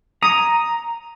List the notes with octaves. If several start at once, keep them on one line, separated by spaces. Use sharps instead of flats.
A#5 D#6